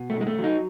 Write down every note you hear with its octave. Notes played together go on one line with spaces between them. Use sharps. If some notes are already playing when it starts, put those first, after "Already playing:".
Already playing: B2
A3
B1 G#3
A3
F#3
D#4